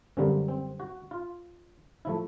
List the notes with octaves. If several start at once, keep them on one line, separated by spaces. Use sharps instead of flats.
F#2 D3 G3 A#3 C4
C4
F#4
F4
F3 A3 E4